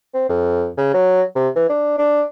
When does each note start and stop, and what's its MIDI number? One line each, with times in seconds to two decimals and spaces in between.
0.14 0.27 60
0.29 0.68 41
0.78 0.93 49
0.94 1.22 54
1.36 1.48 48
1.56 1.69 52
1.70 1.95 62
1.98 2.24 62